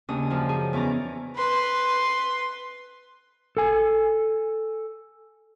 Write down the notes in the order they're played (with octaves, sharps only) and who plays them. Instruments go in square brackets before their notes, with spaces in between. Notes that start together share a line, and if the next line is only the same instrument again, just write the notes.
[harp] D#2 C#3 C#4 D4 D#6
F#2 F3
G#4
E2 E3 C#4 D5 A#5
[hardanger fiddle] B4 C6
[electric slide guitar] A4 G#5